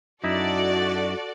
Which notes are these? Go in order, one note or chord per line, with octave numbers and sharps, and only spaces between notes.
F#2 D#4 E4 F#4 A4 D5